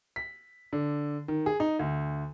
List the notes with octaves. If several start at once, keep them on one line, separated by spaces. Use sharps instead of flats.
B6
D3
D#3
G#4
D#4
D2